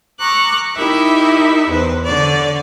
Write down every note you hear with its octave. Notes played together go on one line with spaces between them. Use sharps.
A#5 C#6 D6 E6 F#6
D#4 E4 G4 A#4 E5
E2 B4 C5
D3 C#5 D5